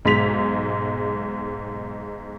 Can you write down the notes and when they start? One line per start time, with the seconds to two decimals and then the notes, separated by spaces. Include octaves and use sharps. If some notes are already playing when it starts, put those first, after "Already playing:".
0.05 B1 G#2 G#3 B6 F7